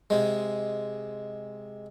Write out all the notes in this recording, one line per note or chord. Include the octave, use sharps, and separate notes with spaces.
C3 G#3